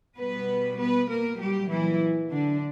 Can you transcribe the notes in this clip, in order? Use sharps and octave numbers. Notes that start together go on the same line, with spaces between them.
B2 G3 B3 B4
B3 B4
A#3 A#4
A#2 F#3 G3 G4
E3 E4
D3 D4